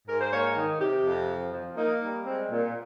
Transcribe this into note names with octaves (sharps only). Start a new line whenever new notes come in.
G#2 A#4
C5
A#3 C#5
D#3
C3 G4
F2
F3
F3
A#3 D#4
G3
G#3 C4
A#2